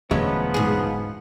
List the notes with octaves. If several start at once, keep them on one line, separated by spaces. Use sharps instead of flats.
E1 D2 F3 F#3 G#3 B3 C#4 E5
G#2 G#4